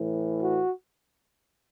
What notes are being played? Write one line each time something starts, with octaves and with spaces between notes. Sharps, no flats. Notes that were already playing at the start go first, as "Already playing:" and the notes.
Already playing: A2 E3
F#4